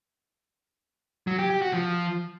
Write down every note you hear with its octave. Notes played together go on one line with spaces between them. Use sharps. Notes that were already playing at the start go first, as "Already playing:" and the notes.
F#3
G4
G4
F#4
F3